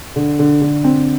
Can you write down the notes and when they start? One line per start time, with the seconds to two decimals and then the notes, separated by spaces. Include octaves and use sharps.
0.16 D3
0.39 D3
0.62 D3
0.84 C4